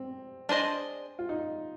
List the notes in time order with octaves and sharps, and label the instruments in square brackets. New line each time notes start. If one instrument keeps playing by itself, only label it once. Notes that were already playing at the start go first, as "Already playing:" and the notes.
Already playing: [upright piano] C4
[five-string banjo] D4 G#4 C5 D#5
[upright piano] F4
D#4